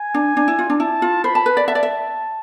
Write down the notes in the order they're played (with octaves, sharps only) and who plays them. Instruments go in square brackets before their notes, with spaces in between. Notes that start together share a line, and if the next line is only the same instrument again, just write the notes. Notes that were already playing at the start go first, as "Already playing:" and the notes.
Already playing: [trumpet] G#5
[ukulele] D4
D4
E4
F4
D4
[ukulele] E4 [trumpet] A5
[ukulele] F4
[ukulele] C5 [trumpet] B5
[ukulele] A5
B4
D5
[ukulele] E5 [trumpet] A5
[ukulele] D5
E5